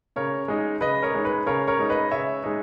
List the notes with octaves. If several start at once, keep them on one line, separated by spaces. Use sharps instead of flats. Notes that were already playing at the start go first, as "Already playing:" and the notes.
C#3 A#4 C#5
G#3 D#4
C#3 B4 D#5
A#4 C#5
G#3 D#4
B4
C#3 A#4 C#5
A#4 C#5
G#3 D#4
B4 D#5
C#3 C#5 E5
G#3 D#4